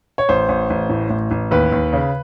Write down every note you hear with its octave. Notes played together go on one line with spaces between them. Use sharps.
C#5
A1 C5
A1
A1
A2
A1
A1
D#2 B4
D#2
C#3